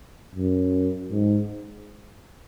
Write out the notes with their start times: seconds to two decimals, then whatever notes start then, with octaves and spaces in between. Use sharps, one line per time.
0.35 F#2
1.11 G#2